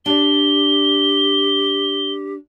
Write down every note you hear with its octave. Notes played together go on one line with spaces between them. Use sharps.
D4 G4 D5 G7